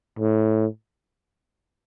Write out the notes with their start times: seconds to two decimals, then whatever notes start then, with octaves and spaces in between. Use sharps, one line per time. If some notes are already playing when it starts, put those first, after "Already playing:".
0.19 A2